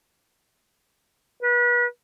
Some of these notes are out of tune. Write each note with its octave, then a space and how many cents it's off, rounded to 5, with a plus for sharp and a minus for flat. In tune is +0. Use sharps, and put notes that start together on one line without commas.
B4 -35